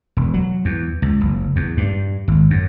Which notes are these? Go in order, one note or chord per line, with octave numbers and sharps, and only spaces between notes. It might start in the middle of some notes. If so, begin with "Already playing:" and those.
E1
F#3
E2
C#2
F#1
E2
G2
G#1
F#2